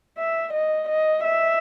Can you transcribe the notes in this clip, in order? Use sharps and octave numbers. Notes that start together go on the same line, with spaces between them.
E5
D#5
D#5
E5